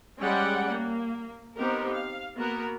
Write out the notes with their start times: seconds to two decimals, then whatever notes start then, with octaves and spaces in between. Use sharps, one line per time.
0.22 G3 G#3 C#4 D5 F#5 G5
0.69 A#3
1.57 B3 C4 D#4 G4 A#4
1.93 F5
2.37 A#3 B3 F#4 A#4